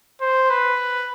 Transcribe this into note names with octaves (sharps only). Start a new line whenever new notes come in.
C5
B4